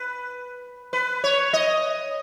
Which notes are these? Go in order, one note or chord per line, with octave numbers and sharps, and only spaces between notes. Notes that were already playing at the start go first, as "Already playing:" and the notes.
Already playing: B4
B4
C#5
D#5